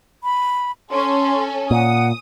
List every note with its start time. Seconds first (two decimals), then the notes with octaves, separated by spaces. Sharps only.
0.24 B5
0.90 C#4 A4 C6
1.71 A#2 F#5 D#6